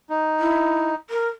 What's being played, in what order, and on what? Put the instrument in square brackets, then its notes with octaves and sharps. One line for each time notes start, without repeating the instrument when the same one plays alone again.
[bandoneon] D#4
[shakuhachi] E4
A#4